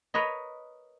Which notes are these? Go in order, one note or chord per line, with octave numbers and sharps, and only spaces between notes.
A#4 B4 C#5 D#5